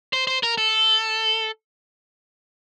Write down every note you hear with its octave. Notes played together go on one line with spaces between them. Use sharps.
C5
C5
A#4
A4